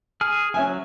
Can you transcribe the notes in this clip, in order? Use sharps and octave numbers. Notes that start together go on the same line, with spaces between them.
G#4 G#5 F6
F#3 C#4 E5 G#5